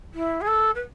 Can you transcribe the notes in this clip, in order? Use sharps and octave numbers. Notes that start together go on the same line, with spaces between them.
E4
G#4
A4
B4